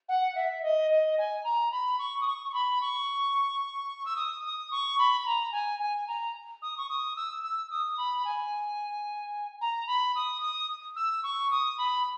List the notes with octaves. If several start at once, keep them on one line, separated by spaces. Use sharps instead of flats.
F#5
E5
D#5
D#5
G#5
A#5
B5
C#6
D#6
C#6
C#6
B5
C#6
E6
D#6
D#6
C#6
B5
B5
A#5
G#5
G#5
A#5
D#6
C#6
D#6
E6
E6
D#6
B5
G#5
A#5
B5
D#6
D#6
E6
C#6
D#6
B5